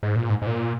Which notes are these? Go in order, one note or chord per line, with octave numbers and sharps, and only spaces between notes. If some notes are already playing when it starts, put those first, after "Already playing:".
G#2
A#2
G#2
G#2
A#2